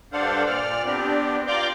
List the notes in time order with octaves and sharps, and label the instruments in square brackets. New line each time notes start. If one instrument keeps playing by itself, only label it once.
[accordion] G2 D4 A4 C5 F5 F#5
A#2 D5 F6
B3 C4 D4 G4
F4 D5 G5 A#5 C6 D6